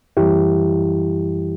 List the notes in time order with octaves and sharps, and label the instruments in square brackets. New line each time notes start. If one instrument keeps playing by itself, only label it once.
[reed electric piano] F#2 E3 G3 E4 G4